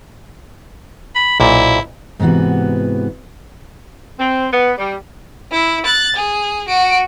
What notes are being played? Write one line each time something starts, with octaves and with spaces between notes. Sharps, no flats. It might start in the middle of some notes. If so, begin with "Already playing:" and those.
B5
B1 A#2 E4
G#2 C3 E3 B3 F#4
C4
B3
G3
E4
F#6 A6
G#4
F#4 D7